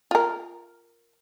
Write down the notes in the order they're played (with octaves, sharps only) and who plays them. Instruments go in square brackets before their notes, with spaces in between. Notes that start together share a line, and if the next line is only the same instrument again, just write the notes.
[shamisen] F4 A#4